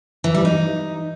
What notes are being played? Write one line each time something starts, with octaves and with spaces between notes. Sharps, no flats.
E3
G3
D#4